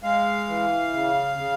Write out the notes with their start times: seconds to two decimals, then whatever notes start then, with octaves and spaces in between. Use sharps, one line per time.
0.03 G#3 F5
0.48 E3
0.93 C#3
1.38 C#3